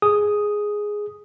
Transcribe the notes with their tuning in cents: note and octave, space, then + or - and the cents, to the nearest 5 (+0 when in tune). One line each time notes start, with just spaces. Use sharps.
G#4 +0 D#6 +0